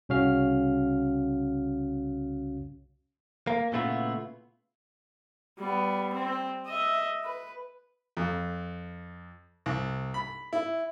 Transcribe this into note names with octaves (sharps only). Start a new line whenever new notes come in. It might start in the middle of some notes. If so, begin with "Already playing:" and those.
C2 C#3 C#4 F#4 F5 F6
A#3
A#2 C#3 A3 B3 E4 F4
G3 B3
C4
D#5 E5
B4
F2
C2
B5
E4